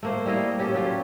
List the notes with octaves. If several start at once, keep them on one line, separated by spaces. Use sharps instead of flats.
A3 A#3 C5
G3 E4 D#5 F5
C#4 G4 A4
F#3 C#4 F4 G4